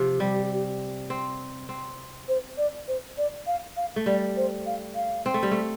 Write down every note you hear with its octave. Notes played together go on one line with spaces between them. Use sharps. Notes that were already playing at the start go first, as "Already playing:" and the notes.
Already playing: C3 F3 G4
G3
C4
C4
C5
D5
C5
D5
F5
F5
A3
G3 D5
C5
F5
F5
C4
A3
G3
A3